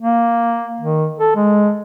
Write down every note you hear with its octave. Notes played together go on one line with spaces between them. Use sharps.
A#3
D#3
A4
G#3